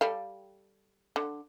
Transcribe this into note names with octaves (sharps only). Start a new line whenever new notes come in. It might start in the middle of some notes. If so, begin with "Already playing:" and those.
G3 A4 F5
D3